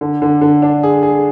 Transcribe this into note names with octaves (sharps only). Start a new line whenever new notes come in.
D3
D3
D3
D4
G#4
G#4